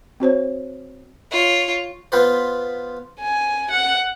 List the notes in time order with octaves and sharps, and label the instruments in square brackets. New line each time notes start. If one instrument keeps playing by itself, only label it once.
[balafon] C4 F#4 C5 C#5
[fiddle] F4 C#5
[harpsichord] B3 F4 B4 C5
[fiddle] G#5
F#5